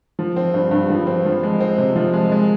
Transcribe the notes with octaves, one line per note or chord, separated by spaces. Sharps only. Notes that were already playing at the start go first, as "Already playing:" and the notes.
F3
C4
G2
G2
F3
C4
F3
G#3
C4
C3
F3
G#3
G#3